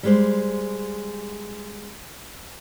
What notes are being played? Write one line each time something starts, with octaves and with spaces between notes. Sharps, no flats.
G3 G#3 C5